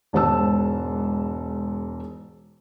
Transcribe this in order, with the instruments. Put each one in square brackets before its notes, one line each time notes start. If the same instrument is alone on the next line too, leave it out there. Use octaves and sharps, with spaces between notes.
[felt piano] E1 G#2 C5 A5 E6